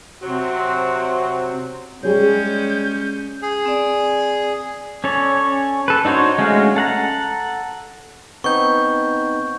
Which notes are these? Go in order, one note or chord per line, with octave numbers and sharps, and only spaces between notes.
C3 F#3 C4 F#4
G3 G#3 C#4 G#4 C#5 G6
G#4
C4 D5
C#4 A4 C#5 D5
A4 B4
D4 D#4 F#4 C5 C#5
G#3 A3 C#4 F#4 F5
A4 F#5 A#5
B3 C4 D#4 C#6 G6